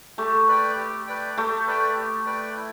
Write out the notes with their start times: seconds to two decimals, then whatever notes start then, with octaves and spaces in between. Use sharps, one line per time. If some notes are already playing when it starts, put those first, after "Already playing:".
0.18 A3 G4
0.48 B4 D5 G5
0.77 G4
1.07 B4 D5 G5
1.37 A3 G4
1.67 B4 D5 G5
1.96 G4
2.26 B4 D5 G5
2.57 E4